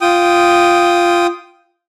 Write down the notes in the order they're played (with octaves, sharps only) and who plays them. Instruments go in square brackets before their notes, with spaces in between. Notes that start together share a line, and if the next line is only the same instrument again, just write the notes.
[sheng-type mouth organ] F4 G5 D#6